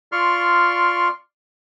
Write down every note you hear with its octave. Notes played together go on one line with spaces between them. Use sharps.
F4 D5 C6 C#6 F6